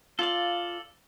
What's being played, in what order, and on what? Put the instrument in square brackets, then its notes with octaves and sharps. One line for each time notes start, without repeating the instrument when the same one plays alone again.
[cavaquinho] F4 F5 [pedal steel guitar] A4 D5